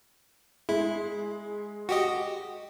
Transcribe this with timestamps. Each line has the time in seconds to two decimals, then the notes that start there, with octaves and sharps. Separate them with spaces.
0.69 G#3 E4
1.89 F#4 G4 D#5